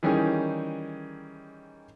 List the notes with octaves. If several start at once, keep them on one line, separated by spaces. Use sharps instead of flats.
D#3 E3 G3 C#4 D#4 G#4